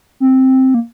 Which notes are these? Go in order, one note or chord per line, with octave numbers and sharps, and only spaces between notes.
C4
A#3